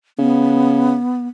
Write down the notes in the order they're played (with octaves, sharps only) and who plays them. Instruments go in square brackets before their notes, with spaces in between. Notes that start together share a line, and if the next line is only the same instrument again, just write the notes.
[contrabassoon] C#3 [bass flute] B3